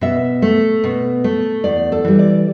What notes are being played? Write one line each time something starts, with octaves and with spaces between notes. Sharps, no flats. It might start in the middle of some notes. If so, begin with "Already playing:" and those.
B2 E5
A3
B2
A3
E2 D5
A4
E3 G3
D5